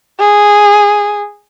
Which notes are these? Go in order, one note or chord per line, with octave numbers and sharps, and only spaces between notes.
G#4